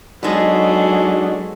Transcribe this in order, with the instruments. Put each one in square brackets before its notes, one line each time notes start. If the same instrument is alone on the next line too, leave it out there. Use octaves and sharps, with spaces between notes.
[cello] F#3 [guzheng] G#3 B3 [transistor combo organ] D4 D#4 F#4 [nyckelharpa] G#4 A4